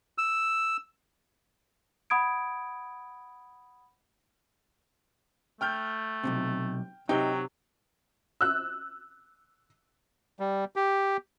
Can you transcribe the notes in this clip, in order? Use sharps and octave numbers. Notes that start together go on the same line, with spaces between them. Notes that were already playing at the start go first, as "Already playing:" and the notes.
E6
F#5 B5 D#6 G#6 D7
A3 G5 F6 G6
B1 G2 C3
C3 F#3 D#4 G5
E6 F#6
G3
G4